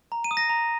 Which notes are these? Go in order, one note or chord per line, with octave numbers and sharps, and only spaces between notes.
A#5
D#7
D#6
A#6
A#5